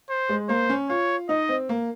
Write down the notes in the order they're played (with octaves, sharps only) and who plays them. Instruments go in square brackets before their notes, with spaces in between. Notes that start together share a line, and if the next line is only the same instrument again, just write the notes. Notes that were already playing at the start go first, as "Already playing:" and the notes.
[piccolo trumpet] C5
[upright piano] G#3
[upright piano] A#3 [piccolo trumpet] C5
[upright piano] C#4
[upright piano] F4 [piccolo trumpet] C#5
[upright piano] D#4 [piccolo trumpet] D#5
[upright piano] C4
A#3